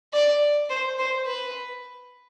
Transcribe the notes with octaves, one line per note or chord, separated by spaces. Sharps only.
D5
C5
C5
B4